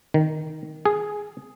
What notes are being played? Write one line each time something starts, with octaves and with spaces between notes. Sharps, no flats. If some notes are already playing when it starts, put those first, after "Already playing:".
D#3
G#4